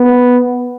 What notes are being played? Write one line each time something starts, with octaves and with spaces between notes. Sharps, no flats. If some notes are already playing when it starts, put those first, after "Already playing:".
Already playing: B3